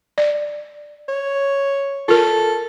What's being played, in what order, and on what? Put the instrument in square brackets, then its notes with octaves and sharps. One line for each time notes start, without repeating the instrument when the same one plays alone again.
[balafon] D5
[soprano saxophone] C#5
[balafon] F4 A#4 [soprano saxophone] A4